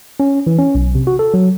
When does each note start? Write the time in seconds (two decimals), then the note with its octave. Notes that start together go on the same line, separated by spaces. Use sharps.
0.20 C#4
0.47 E3
0.59 C#4
0.75 B1
0.95 C3
1.07 F#4
1.19 A4
1.34 F#3